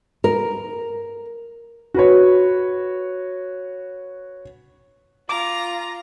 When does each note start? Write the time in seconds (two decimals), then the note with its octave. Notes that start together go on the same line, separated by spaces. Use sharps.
0.24 A#4
1.94 F#4 B4 C#5
5.29 F4 A#5 D6